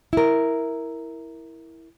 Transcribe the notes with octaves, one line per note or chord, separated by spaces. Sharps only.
E4 A#4